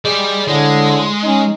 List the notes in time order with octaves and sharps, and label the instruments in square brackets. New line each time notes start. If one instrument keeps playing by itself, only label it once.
[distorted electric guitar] G3 D5 [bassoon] G#3
[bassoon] A2 [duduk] D3 [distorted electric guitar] G#3
[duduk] C#4 [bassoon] D#4